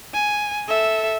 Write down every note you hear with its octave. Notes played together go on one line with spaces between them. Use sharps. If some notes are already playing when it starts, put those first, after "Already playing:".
G#5
A4 E5